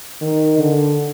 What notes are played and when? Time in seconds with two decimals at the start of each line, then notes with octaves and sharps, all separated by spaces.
0.22 D#3
0.59 D3